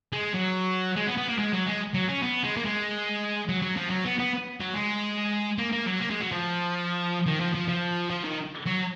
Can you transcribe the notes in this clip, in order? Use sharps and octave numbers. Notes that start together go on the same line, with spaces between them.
G#3
F#3
G#3
B3
B3
A#3
G#3
F#3
G#3
F#3
C#4
B3
G#3
A#3
G#3
F#3
F#3
F3
F#3
B3
B3
F#3
G#3
A#3
A#3
F#3
A#3
G#3
F#3
F3
D#3
F3
F3
F3
F3
D#3
F#3